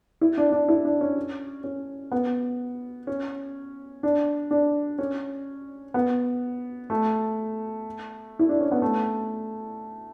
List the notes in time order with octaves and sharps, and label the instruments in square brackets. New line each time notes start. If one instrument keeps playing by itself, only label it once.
[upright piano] E4
D4
D4
E4
D4
C#4
C#4
B3
C#4
D4
D4
C#4
B3
A3
E4
D4
C#4
B3
A3